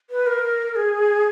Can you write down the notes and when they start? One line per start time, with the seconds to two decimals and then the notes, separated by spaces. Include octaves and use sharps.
0.10 B4
0.27 A#4
0.76 G#4